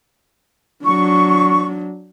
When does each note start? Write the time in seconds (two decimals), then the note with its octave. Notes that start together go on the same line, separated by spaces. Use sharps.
0.85 F#3 D4 C#6